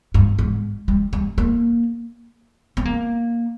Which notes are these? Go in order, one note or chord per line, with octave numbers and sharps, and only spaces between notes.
G2
G#2
G3
G3
A#3
C4
A#3